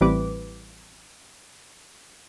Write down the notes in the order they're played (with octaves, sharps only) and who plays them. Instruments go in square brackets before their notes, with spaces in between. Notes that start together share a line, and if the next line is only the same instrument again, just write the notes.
[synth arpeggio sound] A1 E3 G3 C4 B4 D6